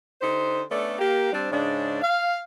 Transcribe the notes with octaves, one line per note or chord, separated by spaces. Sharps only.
D3 D#4 G4 C5
A3 B3 C#4 D4 A4 D5
A#3 G4
G3 C4 D4
G#2 C#3 G#3 D4
F5